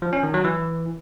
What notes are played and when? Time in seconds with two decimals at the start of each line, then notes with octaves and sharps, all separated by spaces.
0.02 F3
0.13 C#4
0.23 D#3
0.34 F#3
0.44 E3